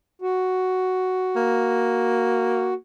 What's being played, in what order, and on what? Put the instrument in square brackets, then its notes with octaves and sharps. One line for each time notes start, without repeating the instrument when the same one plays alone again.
[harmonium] F#4
[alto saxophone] A#3